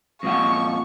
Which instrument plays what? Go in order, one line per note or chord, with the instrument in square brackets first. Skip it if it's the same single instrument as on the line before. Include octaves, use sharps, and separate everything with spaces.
[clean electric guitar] F2 A#2 F#5 [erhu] C#6